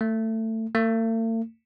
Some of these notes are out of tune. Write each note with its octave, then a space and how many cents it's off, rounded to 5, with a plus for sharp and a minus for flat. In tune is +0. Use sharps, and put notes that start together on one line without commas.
A3 +20
A3 +45